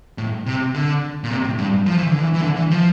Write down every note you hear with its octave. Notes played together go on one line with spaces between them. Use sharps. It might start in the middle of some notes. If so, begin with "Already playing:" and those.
A2
C3
D3
A#2
C3
A2
G2
F3
E3
D3
E3
E3
D3
E3
F3